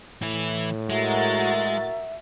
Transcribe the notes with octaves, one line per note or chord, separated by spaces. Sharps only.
A2 E3 E4
G#3 F#4 A#4 E5 A6